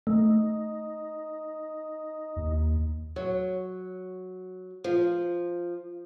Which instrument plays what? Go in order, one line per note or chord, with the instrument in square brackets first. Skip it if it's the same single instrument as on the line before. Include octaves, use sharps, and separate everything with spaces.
[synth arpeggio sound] A3 [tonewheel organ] D#4
[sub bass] D#2
[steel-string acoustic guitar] F#3
F3